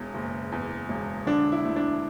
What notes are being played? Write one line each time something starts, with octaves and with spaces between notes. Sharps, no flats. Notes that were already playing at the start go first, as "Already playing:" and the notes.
Already playing: E1 E2
F#1
E2
E1
D3 D4
E4
D2
D4